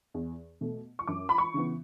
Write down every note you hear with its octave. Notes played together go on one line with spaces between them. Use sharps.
E2
B2 A3
C#6
F#2 D6
B5
C#6
C#3 E3 B3